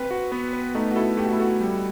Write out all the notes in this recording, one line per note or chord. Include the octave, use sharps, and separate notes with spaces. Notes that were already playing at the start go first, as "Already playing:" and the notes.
Already playing: C4 B4
F#4
B3
B4
A3 D#4
F#4
E4 A4
A3 G4
F#4
E4
F#4 A4
G3